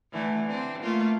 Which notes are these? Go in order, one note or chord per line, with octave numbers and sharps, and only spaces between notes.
D3 E3 A3
D3 C4
A3 A#3 F4